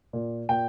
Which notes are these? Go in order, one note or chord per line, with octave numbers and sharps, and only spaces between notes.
A#2
A#2 G5